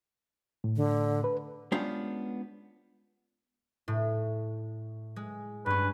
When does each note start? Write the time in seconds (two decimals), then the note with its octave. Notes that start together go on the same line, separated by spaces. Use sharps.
0.64 A2
0.76 D3
1.24 B4
1.72 G#3 B3 C#4 D4 F4 G4
3.88 A2
5.16 G#3
5.66 G2 C#4 B4